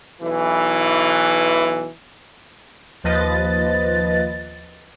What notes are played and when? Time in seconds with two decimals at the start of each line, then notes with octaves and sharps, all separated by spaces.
0.22 B1 E3
3.04 D#2 F3 B4 D#5 A6